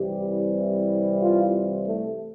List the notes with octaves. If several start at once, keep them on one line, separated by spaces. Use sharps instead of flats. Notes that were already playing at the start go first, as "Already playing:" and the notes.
Already playing: C2 C3 E3 G3 G4
F4
A3